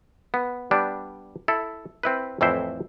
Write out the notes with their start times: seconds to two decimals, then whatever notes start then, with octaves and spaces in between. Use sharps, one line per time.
0.34 B3
0.71 G3 B3 D4
1.48 E4 A4
2.03 C4 E4 B4
2.41 F2 A2 E3 C4 E4 C5